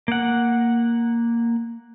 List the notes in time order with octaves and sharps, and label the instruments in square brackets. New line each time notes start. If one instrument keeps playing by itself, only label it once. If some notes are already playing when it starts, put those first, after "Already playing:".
[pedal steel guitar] A#3 F#5